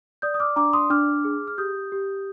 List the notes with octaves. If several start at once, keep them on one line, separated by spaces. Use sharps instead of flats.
D5 D#6 G6
D#6
D6 F6
D4 A#5 D6
C6 D#6
D4 D6 F6
G#4
F6
G4 D#6 G6
G4